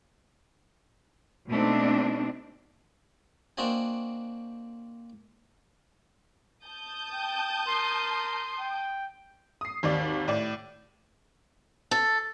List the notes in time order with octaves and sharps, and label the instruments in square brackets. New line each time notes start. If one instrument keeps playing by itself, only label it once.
[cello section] B2 G#3 A3 C4 D4 D#4
[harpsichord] A#3 C4 D4 F#4 D#5 G#5
[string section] A5 D#6 G6
[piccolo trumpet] G5
[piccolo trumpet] A#4 [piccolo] C6
[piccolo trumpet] G5
[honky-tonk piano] D#6 C7
G#1 D#2 D5
A2 D5
[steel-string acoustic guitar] A4